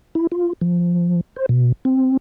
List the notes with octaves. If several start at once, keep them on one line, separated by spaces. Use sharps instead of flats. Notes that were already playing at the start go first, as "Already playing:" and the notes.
E4
F4
F3
C5
B2
C4